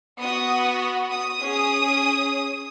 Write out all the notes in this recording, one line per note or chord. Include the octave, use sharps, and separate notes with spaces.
B3 F#4 D#6
D#6
C#4 G#4